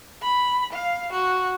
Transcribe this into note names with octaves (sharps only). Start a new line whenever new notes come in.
B5
F5
F#4